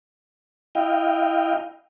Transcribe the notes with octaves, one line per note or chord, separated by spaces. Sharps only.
E4 D#5 F5 G5